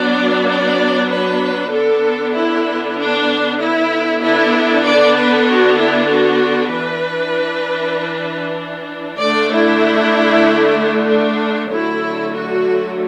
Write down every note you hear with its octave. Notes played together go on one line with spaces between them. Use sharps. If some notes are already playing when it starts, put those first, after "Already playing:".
Already playing: F#3 B3 D4 D5
D5
B4
D3 B3 D4 A4
E4
D4
E4
D3 B3 D4 E4
D5
B4
F#4
E4
F#4
E3 D4 B4
D3 A3 D4 D5
E4
D4
D3 F#3 A3 E4
F#4